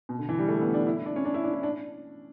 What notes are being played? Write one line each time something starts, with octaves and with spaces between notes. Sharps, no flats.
B2
D3
E3
G3
A3
B3
D4
E4
E4
D4
C#4
D4
E4
D4
E4
D4